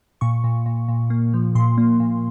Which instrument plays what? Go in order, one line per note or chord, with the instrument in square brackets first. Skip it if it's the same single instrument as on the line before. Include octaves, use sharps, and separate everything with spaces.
[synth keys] A#2 C#6
A#2
A#2
A#2
A#3
F3
A#2 C6
A#3
A#2